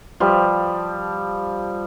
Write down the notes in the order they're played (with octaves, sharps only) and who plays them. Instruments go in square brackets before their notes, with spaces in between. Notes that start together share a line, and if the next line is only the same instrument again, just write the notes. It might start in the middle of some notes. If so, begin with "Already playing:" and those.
[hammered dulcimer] F3 G3